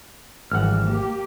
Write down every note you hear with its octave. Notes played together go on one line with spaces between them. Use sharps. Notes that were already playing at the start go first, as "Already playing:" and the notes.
G#1 E3 G3 F#5 F6
A#3 G4